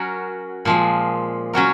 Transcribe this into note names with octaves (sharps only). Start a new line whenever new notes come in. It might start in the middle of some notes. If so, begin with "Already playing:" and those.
Already playing: F#3 C#4 F#4 A#4
A#2 F3 G#3
F#3 C#4 F#4 A#4